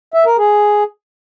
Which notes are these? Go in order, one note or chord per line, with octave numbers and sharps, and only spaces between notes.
E5
A#4
G#4